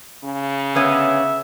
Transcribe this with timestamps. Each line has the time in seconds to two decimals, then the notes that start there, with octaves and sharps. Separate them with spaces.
0.24 C#3
0.75 D3 B3 C#4 E5